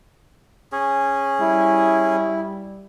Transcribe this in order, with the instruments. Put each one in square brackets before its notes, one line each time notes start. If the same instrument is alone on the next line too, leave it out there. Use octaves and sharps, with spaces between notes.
[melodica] C#4 G#4
[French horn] G3 [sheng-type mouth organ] E4